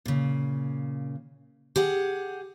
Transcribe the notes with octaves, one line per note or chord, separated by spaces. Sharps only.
A#2 C#3
G4 G#4 F#5